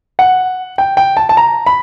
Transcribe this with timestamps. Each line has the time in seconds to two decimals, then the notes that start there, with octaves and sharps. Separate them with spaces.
0.19 F#5
0.78 G5
0.97 G5
1.17 A5
1.29 A5
1.37 A#5
1.66 B5